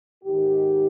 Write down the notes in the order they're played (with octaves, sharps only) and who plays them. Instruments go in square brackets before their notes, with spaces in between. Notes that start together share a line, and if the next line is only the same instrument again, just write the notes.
[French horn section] G#2 D#3 G4